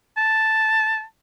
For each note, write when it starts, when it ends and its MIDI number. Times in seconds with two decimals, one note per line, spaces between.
0.17 1.03 81